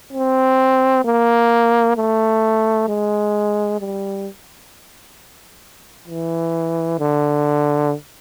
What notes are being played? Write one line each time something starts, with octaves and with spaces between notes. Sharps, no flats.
C4
A#3
A3
G#3
G3
E3
D3